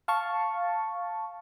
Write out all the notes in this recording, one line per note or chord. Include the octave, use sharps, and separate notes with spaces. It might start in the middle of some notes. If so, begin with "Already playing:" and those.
F5 A5 C#6